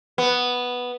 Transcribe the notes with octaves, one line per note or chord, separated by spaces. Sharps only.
B3